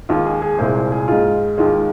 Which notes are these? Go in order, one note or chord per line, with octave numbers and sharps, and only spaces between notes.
D#2 D#3 G#3 F4
G#4
G#4
C2 A#2 G#3 C5
C5
G#4
G#2 G#3 F4
D#2 D#3 G#3 F4